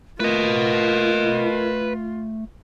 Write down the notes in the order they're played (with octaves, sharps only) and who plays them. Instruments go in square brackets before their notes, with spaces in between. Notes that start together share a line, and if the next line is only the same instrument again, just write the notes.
[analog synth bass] A3 [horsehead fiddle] F4 [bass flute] A#4 [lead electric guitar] B4 D#5